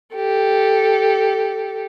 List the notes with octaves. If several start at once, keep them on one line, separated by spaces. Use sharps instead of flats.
G4 A4